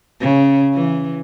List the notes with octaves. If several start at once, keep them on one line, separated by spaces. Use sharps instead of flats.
C#3
E3